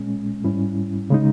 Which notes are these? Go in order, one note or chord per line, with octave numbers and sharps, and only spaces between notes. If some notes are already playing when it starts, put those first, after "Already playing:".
Already playing: A#2 G#3 C#4
G#2 G3 C#4 E4
C#3 G#3 D#4